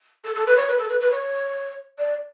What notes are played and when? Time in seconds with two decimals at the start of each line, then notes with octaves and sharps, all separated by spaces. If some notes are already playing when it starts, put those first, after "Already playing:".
0.25 A4
0.35 A4
0.47 B4
0.57 C#5
0.68 B4
0.78 A4
0.90 B4
1.01 B4
1.11 C#5
1.99 D5